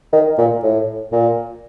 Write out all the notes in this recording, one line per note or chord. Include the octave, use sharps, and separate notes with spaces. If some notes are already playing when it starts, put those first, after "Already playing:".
D#3
A#2
A2
A#2